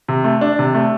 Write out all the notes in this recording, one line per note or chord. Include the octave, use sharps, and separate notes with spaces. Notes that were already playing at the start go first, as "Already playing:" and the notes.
C3
A3
D4
C3
A3